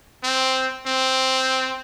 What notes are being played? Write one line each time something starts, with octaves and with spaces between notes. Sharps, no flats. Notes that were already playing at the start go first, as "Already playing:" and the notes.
C4
C4